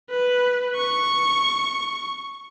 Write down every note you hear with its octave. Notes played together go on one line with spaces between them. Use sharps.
B4
C#6